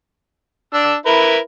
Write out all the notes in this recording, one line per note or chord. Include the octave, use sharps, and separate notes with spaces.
D4 E6
E4 A#4 B4